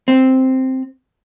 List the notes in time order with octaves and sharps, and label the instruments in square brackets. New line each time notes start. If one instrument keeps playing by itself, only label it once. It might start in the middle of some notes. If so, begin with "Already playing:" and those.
[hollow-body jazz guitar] C4